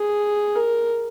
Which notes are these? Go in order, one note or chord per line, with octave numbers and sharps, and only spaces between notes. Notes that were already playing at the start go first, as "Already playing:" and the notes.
Already playing: G#4
A#4